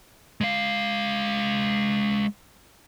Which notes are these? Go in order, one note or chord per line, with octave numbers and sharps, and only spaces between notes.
G#3 F5